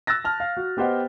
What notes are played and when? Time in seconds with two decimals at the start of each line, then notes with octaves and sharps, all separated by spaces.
0.07 E6 F#6 A6 A#6
0.24 A5 F6
0.40 F5
0.57 F#4
0.77 B3 G4 C5 D#5 F#5 G5